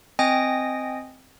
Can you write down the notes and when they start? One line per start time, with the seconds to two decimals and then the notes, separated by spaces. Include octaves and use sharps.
0.19 C4 D#5 G5 G#5 D#6 A#6